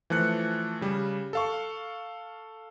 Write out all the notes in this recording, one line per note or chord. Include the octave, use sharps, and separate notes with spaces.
E3 F3 A3 F#6 C#7
C#3 G3
A4 F5 C#6